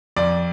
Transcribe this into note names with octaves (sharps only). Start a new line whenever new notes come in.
F2 D5